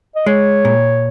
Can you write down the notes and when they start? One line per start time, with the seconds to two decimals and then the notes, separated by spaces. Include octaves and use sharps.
0.15 D#5
0.26 G#3 C#5
0.65 A#2